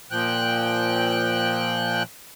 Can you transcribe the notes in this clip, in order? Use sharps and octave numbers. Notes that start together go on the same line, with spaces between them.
A#2 F3 G5 F#6